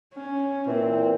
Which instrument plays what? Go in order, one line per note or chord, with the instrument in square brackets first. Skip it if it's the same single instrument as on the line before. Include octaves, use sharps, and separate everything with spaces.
[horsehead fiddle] C#4
[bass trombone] A#2 [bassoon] E3 [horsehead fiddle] C4